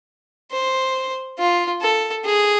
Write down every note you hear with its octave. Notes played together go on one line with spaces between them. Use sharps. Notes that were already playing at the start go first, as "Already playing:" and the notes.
C5
F4
A4
G#4